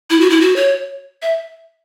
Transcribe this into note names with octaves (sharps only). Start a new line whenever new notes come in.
E4
F#4
E4
F#4
C#5
E5